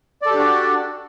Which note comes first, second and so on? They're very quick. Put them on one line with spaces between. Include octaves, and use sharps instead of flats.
D5 A4 G4 D4 F#4